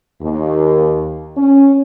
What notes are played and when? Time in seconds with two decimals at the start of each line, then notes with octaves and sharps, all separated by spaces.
0.22 D#2
1.37 C#4